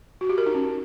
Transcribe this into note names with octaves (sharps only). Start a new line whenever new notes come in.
F#4
G4
A#4
D#4
C#4